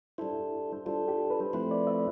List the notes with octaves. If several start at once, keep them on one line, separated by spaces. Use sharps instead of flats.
G3 D4 E4 A4 C5
G3 D4 F4 A4 C5
G4
B4
F3 A3 C4 E4 B4 C5
D5
E5